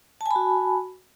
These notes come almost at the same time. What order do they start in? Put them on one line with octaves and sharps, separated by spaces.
A5 G#5 B5 F#4